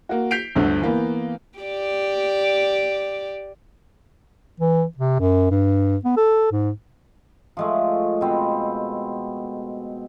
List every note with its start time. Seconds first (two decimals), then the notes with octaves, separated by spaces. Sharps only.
0.09 A#3 F#4
0.31 G6 B6 C7 D7 F7
0.55 G1 D2 D3
0.81 E3 A#3 B3
1.59 G4 D5
4.60 E3
4.98 C3
5.20 F#2
5.51 G2
6.05 B3
6.17 A4
6.52 G#2
7.57 F3 G#3 A3
8.21 B2 C4 B4